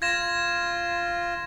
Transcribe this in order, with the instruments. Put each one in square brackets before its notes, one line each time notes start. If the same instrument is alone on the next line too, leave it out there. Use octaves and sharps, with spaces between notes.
[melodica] F4 [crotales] G#6 A#6 E7